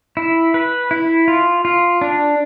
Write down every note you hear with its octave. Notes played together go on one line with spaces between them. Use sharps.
E4
B4
E4
F4
F4
D4